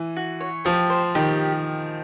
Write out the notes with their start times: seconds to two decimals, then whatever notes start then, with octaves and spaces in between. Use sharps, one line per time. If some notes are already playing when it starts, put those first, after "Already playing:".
Already playing: E3
0.16 F#4
0.40 C#5
0.65 F3 G4
0.90 C5
1.15 D#3 G4